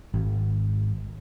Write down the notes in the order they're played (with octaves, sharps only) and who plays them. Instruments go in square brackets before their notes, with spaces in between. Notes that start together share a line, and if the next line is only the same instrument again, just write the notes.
[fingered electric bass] G#1